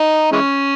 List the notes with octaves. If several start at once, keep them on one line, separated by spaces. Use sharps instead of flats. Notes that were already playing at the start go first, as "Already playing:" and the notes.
Already playing: D#4
E3 G#3 C#4